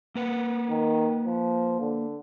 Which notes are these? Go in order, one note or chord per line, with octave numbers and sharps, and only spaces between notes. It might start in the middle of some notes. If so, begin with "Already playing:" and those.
A#3 B4 F#5
D#3
F3
D3